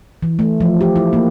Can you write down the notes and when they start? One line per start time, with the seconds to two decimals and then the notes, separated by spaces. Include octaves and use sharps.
0.23 E3
0.39 A3
0.61 F3
0.81 G4
0.96 E4
1.13 A#3